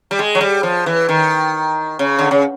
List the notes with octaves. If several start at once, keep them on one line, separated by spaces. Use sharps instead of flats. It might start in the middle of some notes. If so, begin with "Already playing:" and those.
G3
G#3
F#3
G3
F3
E3
D#3
C#3
D3
C#3